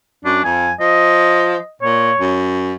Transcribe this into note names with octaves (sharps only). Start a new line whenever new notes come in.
F#2 D4
F2 G#5
F3 D#5
A#2 C#5
F#2